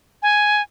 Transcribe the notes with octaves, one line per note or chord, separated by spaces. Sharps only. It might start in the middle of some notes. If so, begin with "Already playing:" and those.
G#5